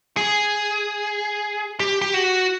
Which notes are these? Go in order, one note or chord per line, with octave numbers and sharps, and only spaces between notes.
G#4
G4
G4
F#4